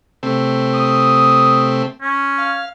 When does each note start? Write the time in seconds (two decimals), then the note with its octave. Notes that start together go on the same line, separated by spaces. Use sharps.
0.23 C3 A3 C4
0.74 D#6
2.02 C#4
2.38 F5